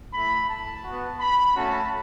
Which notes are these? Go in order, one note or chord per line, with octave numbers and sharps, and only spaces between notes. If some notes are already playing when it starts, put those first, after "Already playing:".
A3 E4 B5
A5
B3 F#4
B5
A3 C#4 F#4 A5